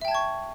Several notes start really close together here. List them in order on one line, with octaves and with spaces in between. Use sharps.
E5 G5 A5 G#6 C#6